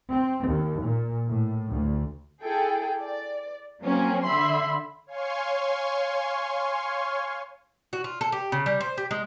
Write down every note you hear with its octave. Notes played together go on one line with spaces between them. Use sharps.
C4
D#2
A#2
A2
D2
E4 G#4 A4 G5
D5
F#3 A#3 C4 C#4
D3 E5 B5 C6
C#5 F5 G#5 C6 C#6
F#4
F4
A4
G4
C#3
G3
C5
G4
G#3